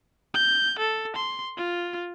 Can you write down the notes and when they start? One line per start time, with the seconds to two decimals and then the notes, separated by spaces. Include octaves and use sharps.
0.34 G6
0.79 A4
1.16 C6
1.58 F4